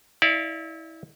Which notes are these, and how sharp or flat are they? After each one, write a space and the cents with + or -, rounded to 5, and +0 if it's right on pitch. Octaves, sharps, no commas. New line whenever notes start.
E4 -30 D5 +0 F5 -25